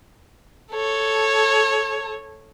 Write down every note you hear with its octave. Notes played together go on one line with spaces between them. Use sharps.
A4 C#5